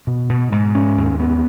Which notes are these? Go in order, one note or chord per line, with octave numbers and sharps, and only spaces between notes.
B2
B2
G#2
C#4
D#2
B3